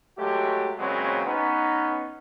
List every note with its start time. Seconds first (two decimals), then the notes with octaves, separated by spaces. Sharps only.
0.18 F#3 G#3 A3 G4
0.79 A#2 C#3 F#3 G#3 B3 C4
1.26 B3 C#4 D#4